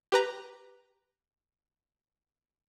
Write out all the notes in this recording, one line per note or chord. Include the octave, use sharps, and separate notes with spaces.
G4 B4 A#5